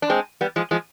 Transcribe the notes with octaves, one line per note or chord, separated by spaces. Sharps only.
D4
G#3 C4
G3 B3
F3 G#3
F3 G#3